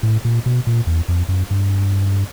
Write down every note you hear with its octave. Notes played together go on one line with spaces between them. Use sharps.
A2
A#2
B2
A#2
E2
F2
F#2
G2